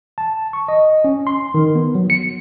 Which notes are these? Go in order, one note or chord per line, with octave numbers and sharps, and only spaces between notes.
A5
C#6
D#5
C#4
C6
D#3
B3
F#3
C#7